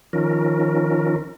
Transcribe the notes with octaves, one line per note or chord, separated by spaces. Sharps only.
D#3 F3 C#4 A#4